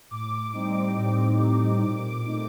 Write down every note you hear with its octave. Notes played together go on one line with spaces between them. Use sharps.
A2 D6
G3 C4 D#4
A2
G3 C4 D#4
A#2
A3 C4 D#4